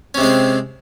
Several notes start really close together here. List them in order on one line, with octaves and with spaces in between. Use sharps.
C#4 C3 G#3 C4